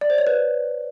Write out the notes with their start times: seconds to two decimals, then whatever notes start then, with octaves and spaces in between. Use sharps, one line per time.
0.01 D5
0.10 C5
0.18 C#5
0.27 B4